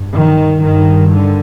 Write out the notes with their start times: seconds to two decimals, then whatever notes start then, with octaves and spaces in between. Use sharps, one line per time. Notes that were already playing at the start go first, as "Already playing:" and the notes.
Already playing: G2
0.14 D#3
0.63 G2 D#3
1.12 D3